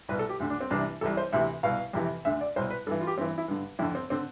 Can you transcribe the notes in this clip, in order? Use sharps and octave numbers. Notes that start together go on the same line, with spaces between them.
C2 B2 B4
A4
G4
D2 D3
D4
C4
C2 C3 E3 D4
C2 C3 E3 A4
C5
D2 C3 E3 E5
C2 B2 F5
F2 C3 E3
D2 D3 E5
D5
C2 B2 C5
B4
G2 E3 A4
F4
G4
G2 E3 C4
E4
G2 D3
F2 D3 E4
C4
D3 C4